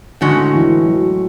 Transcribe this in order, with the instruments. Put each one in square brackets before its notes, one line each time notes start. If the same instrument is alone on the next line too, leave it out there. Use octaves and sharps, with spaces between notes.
[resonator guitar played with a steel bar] A2 G#3 C#4 F#4 [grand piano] D3
[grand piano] E3
F#3